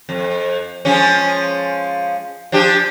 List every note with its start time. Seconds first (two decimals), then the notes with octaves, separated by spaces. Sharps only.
0.09 F2
0.85 F3 G#3 C#4
2.52 F3 D4 G4